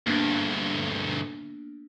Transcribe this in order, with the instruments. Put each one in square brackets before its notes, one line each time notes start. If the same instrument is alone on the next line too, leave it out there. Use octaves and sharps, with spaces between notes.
[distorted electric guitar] D2 G2 [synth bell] A#3 B3 D4